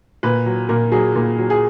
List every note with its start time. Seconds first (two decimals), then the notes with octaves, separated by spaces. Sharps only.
0.23 A#2 B4
0.46 F#3
0.69 A#2 A#4
0.92 F#3 G#4
1.16 A#2
1.38 F#3
1.50 G#4